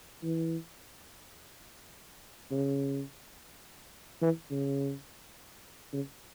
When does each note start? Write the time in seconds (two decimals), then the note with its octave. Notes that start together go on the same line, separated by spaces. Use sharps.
0.23 E3
2.51 C#3
4.22 E3
4.51 C#3
5.93 C#3